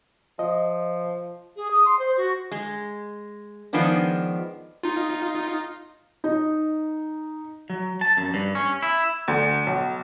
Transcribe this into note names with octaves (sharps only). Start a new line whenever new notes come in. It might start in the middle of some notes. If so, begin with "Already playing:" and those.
F3 D#5
G#4
D#6
C6
C5
F#4
G#3
D#3 F3 G#3 B3 D4
D#4 F4
D#4
F#3
A5
F#2
G2
C#4
E4
D2
B1